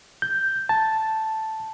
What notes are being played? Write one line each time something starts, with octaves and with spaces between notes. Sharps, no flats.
G6
A5